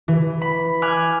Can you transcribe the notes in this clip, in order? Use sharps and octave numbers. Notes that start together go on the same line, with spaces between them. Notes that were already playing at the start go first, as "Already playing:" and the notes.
E3
B5
G#5 D6 F6 F#6 G#6